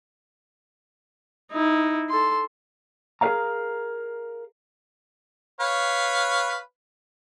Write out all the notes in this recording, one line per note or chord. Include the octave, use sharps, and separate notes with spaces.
D#4 E4
A4 C6
G#4 A#4 B4 C#5 F5 A#5
B4 C#5 F5